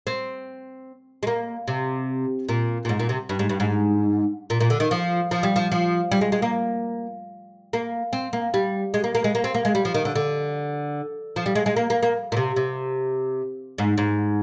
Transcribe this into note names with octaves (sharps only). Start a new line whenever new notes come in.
C4
G#3
A#3
C3
A#2
A#2
G#2
A#2
C3
G2
G#2
G2
G#2
A#2
A#2
D3
D#3
F3
F3
G3
F3
F3
G3
G#3
G#3
A#3
A#3
C4
A#3
G3
G#3
A#3
A#3
G#3
A#3
C4
A#3
G#3
G3
F3
D#3
D3
D3
F3
G3
G#3
G#3
A#3
A#3
A#3
A#2
C3
C3
G#2
G#2